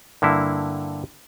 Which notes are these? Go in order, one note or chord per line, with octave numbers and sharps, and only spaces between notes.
G2 D3 A#3 E4